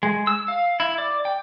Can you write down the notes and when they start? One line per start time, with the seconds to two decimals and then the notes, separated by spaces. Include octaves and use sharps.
0.03 G#3
0.27 E6
0.48 F5
0.80 E4
0.98 D5
1.25 G5